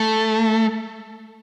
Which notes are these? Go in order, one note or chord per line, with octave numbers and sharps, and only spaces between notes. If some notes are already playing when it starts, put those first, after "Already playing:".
Already playing: A3